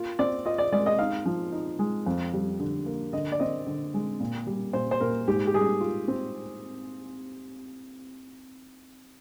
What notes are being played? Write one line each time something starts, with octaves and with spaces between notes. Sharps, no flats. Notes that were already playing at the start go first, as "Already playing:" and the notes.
Already playing: A#3 F4
C4 D5
F4 D#5
D5
G#3 D5
D#5
D#4 F5
F3
D#4
G#3
F2
G3
D3
A#3
D3 D#5
D5
C4 D#5
D3
G#3
A#2
G3
A#2 C5
C5
A#2 A#4
G#2 G4
G4
G3 G#4
F4
C4